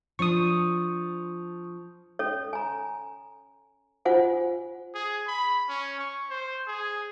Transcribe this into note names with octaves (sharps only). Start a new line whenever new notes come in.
F3 D4 C#6 D#6
C#4 A4 C#5
G#5 A#5
F4 C5 F#5 G#5
G#4
B5
C#4
C#6
C5
G#4